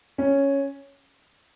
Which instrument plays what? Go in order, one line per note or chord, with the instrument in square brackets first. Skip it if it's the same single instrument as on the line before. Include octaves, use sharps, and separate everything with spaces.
[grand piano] C#4